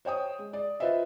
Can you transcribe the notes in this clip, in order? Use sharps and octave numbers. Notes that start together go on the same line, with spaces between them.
C5 C#5 G5 D#6
G#3
D5
F4 B4 C5 D#5 E5